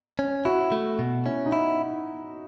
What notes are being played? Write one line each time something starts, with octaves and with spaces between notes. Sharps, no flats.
C#4
E4 F#4
A3
B2
C#4 E4
D#4
E4